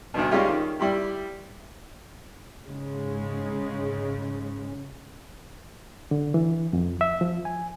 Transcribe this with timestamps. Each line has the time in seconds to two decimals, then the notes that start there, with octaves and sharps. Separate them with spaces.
0.14 D2 G2 B2
0.31 G3 G#3 C#4 D#4 F4 G4
0.48 D#3
0.80 G3 E4 G4
2.67 G#2 C#3 G#3
6.11 D3
6.34 E3
6.73 F2
7.01 E5
7.21 F3
7.45 G#5